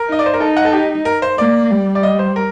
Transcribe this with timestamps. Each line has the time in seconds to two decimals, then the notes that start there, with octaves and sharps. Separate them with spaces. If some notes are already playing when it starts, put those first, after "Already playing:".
Already playing: A#4
0.08 D#4 D#5
0.19 D5
0.26 C5
0.34 A#4
0.40 D#4 A4
0.57 F#5
0.65 A4
0.73 G4
1.05 A#4
1.22 C5
1.38 A#3 D5
1.71 G3
1.95 D5
2.03 D#5
2.19 C5
2.36 A#4